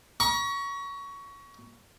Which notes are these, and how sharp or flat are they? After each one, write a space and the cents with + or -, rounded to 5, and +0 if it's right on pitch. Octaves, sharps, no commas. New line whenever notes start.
A#5 +45 C#6 +15